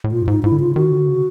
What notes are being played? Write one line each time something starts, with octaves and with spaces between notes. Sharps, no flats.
A2
A#2 F4
G2
G#2 D#4
G#2 E4
D3
C#3 F4
D#3 F#4
D3
C#3